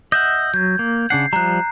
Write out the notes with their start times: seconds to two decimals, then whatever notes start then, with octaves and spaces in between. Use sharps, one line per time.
0.12 D#5 E5 F#5 G6
0.54 F#3 G6 G#6
0.79 A#3
1.10 C#3 D4 F#5 C7
1.33 F3 G3 A#5 F#6